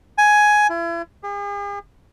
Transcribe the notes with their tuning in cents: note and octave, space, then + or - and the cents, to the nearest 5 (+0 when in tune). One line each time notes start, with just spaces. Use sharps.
G#5 +10
E4 +40
G#4 -45